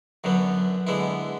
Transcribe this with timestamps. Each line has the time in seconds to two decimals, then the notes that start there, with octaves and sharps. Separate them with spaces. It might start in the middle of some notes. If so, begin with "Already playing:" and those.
0.24 F#2 D3 F#3 B3
0.87 D3 G#3 B3 E4